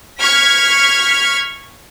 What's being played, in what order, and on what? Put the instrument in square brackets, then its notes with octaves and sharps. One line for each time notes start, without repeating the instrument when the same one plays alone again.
[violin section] C#6 F6 G#6 B6